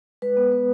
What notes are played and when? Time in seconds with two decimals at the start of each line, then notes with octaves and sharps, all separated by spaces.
0.22 G#3 B4
0.37 B3
0.52 B3